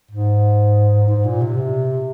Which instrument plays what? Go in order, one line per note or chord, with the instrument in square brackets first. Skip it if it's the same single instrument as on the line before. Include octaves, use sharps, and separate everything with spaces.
[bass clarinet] G#2
G#2
A#2
C3